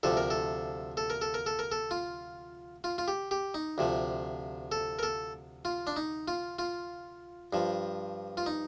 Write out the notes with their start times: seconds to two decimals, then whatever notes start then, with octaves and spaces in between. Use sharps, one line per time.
0.03 D2 C3 F3 A4
0.17 A#4
0.30 A4
0.97 A4
1.10 A#4
1.22 A4
1.34 A#4
1.46 A4
1.59 A#4
1.72 A4
1.91 F4
2.84 F4
2.98 F4
3.08 G4
3.31 G4
3.54 D#4
3.78 D2 C3 F3
4.72 A4
4.99 A#4
5.03 A4
5.65 F4
5.87 D4
5.96 D#4
6.28 F4
6.59 F4
7.53 G2 F3
8.37 F4
8.46 D#4